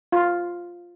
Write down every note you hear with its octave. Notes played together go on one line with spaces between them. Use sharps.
F4